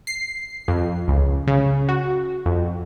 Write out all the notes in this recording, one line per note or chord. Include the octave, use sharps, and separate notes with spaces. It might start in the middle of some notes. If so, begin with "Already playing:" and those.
C7
F2
C#2
C#3
F#4
F2